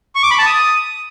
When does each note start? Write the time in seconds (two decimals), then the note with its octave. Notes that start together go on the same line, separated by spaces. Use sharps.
0.15 C#6
0.23 D6
0.31 B5
0.38 A5
0.46 D#6